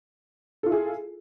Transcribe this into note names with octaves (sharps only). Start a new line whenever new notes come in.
E4 F4 G#4 A4